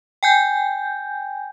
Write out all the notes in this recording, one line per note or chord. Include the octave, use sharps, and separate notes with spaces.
G5 G#5 G6